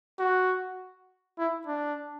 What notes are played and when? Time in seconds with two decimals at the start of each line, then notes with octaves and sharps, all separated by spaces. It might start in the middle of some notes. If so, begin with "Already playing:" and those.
0.19 F#4
1.39 E4
1.67 D4